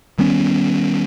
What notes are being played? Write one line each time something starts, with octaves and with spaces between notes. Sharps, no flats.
D#3 G3 B3 C#4